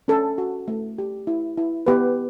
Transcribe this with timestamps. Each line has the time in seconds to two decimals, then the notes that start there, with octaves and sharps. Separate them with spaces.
0.08 C#4 A4
0.38 F#4
0.68 A3
0.98 G4
1.27 E4
1.57 E4
1.87 B3 G4 B4